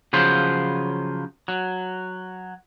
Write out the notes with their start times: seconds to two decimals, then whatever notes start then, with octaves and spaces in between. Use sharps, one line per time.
0.13 C#3 F3 F#3 C5
1.48 F#3